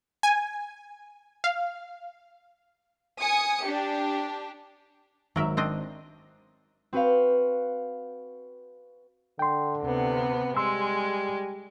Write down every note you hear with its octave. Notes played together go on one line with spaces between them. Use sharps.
G#5
F5
G#5 D#6 C#7
D4 G4
G#1 F#3 A#4 E5
C4 D4 D#5
C4 F#4 B4 C5 F5
D3 G5 C6
D2 C3 B3
G3 G#3 C6 E6